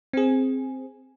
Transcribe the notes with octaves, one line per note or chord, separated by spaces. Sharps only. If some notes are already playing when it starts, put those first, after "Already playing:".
C4 G#4